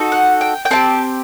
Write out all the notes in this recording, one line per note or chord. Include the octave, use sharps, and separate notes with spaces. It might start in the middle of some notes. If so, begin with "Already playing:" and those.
Already playing: D#4 F#4 A4
F#5
G5
G5
C4 E4 G4 A5